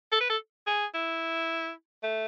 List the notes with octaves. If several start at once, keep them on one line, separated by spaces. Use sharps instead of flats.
A4
B4
A4
G#4
E4
A3